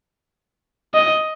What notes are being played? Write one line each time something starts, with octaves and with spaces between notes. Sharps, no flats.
D#5